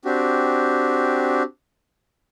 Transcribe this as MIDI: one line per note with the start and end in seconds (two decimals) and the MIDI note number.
0.05 1.43 60
0.05 1.43 62
0.05 1.43 66
0.05 1.43 67